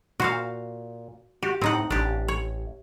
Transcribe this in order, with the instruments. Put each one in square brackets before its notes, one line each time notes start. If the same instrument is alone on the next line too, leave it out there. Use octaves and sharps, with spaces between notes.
[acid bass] A#2 [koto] F#4 C5 F5
[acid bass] F#4 [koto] G4
[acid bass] A2 [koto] C4 D#4 F#5
[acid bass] A1 [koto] D4 G4
[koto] C#5